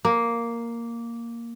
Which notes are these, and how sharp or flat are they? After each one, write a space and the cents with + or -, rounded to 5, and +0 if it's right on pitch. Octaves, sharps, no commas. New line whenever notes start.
A#3 +0